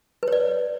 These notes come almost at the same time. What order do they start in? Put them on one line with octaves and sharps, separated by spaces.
B4 C#5 D5